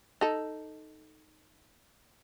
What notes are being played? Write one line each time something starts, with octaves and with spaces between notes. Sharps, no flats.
D#4 A4